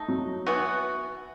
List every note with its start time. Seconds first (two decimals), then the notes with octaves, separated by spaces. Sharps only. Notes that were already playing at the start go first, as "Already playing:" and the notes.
Already playing: A3 D#4
0.08 F#3
0.46 E3 B3 F#4